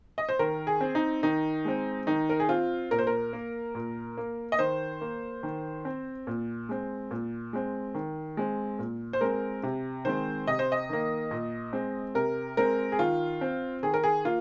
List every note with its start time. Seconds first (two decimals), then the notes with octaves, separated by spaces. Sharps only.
0.18 D#5
0.29 C5
0.39 D#3 A#4
0.67 G#4
0.81 C4
0.95 D#4
1.23 D#3 D#4
1.65 G#3 C4
2.07 D#3 D#4
2.29 A#4
2.40 G#4
2.49 C4 F4
2.91 A#2 A#4
2.99 C5
3.07 A#4
3.33 A#3
3.75 A#2
4.17 A#3
4.52 D#5
4.59 D#3 C5
5.01 A#3
5.43 D#3
5.85 C4
6.27 A#2
6.69 G#3 C4
7.11 A#2
7.53 G#3 C4
7.95 D#3
8.37 G#3 C4
8.79 A#2
9.13 C5
9.21 G#3 C4 A#4
9.63 C3
10.05 D#3 G#3 C4 C5
10.47 C3 D#5
10.59 C5
10.72 D#5
10.89 D#3 A#3
11.31 A#2
11.73 G#3 C4
12.15 C3 A#4
12.57 G#3 C4 A#4
12.92 G#4
12.99 D#3 F4
13.41 C4
13.83 D#3 G#4
13.94 A#4
14.04 G#4
14.25 A#3 F4